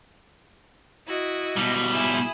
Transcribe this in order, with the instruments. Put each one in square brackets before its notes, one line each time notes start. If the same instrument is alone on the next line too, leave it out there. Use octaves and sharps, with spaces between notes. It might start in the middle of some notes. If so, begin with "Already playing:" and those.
[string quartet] E4 F#4 D#5
[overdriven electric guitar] B2 G3
[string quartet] E4 G#4